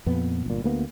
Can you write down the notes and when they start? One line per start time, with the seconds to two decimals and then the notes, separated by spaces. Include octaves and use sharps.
0.06 F2 A#2 B3
0.46 G1 A#2
0.64 D2 A#3 B3